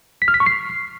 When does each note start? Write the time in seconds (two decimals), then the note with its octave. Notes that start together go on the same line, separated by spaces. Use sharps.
0.22 B6
0.28 F6
0.34 B6
0.40 C#6
0.46 C7